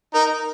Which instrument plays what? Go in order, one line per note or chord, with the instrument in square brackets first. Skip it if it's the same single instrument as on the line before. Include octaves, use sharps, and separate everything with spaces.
[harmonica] D#4 [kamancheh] A#4